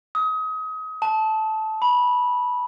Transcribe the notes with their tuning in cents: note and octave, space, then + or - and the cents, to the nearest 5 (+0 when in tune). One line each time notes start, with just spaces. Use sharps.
D#6 +30
A5 -10
B5 -15